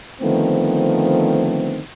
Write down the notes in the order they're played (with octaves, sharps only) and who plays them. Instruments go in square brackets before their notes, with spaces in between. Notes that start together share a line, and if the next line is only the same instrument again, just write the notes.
[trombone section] D3 D#3 F3 A3 B3 C4